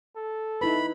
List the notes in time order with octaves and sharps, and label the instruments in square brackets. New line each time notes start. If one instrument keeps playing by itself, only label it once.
[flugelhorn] A4
[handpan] D#4 E4 B4 [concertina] B5